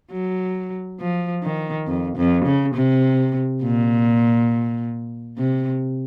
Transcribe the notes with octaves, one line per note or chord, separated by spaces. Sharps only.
F#3
F3
D#3
F2
F2
C#3
C3
A#2
C3